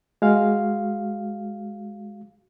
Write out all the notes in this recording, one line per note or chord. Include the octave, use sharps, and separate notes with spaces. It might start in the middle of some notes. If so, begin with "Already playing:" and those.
G#3 F#4 F5